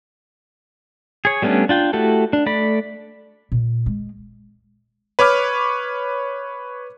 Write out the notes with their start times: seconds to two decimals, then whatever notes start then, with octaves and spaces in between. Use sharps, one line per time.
1.25 G#4 C#5
1.42 G3 A3 B3 C#4 D4
1.69 D4 F4 G5
1.93 A3 E4 F#4 G4 A4
2.33 D4
2.46 A3 D5 B5
3.52 A#2
3.86 G#3
5.19 B4 C#5 C#6 D6 F6